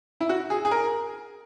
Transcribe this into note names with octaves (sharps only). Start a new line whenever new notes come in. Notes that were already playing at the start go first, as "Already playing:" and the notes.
E4
F#4
G#4
G#4
A#4